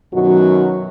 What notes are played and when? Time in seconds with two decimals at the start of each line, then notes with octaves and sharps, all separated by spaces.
0.14 F#2 B2 D#3 F#3 F#4